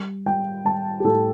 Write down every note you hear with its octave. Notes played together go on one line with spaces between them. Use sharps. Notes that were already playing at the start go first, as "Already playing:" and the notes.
Already playing: G3
G3 G5
G3 A5
G4
A2 A4